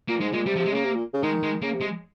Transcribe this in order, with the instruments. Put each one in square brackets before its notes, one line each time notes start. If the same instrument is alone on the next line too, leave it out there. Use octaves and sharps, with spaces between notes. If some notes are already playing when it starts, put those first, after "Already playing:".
[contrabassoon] A#2 [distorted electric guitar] A#3
[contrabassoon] G#2 [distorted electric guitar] G#3
[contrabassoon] A#2 [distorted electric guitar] G#3
[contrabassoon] C3 [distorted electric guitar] G3
[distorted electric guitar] F3
[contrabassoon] C3
[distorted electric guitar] G#3
[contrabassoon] C#3 [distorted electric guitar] A#3
[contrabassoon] C3
A#2
C#3
[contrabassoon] D#3 [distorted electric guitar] G#3
[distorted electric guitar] G#3
[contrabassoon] C#3 [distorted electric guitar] A#3
[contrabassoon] C3
[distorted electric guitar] G#3